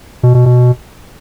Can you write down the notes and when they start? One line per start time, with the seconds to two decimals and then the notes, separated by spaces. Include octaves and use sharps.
0.23 B2
0.35 B2
0.46 B2